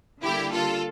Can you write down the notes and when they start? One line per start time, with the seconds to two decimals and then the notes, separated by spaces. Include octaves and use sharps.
0.23 D3 G3 A#3 E4 G4
0.53 F4 A4